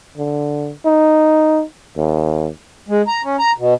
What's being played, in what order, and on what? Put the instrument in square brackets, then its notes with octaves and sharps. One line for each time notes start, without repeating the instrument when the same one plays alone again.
[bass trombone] D3
D#4
D#2
[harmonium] G#3
A#5
C#4
A#5
B2